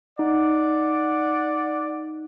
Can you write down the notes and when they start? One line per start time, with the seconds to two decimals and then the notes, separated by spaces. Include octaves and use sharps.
0.19 D#4 D5 F#5